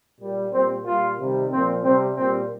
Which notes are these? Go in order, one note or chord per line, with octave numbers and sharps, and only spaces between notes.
A#2 G3
A#2 G3 C4
A#2 G3 F4
C3 D#3 G3
A#2 F3 C4
C3 G3 C4
A#2 G3 C4